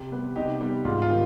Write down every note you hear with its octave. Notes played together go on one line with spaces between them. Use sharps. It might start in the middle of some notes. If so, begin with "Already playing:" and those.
Already playing: C3 G4
G3 B3
C3 D#4 G4
G3 B3
G#2 F4
F4
D#3 G3